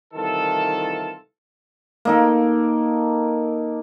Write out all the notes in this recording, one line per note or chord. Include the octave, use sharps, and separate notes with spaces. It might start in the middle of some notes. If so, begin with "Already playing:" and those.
C2 D#3 E3 F4 A4
A#3 D#4 A4